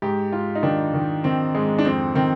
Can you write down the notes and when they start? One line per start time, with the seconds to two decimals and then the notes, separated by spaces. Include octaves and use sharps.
0.02 G#2 G4
0.32 G#2 F4
0.55 D#4
0.63 D#3 D4
0.94 D#3
1.24 D#3 C4
1.55 G#2 G#3
1.78 D4
1.85 F2 C4
2.15 D#3 C4